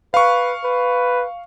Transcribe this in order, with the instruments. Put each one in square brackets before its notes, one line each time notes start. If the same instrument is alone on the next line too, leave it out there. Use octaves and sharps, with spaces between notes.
[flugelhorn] B4 [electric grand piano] F5 C#6
[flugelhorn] B4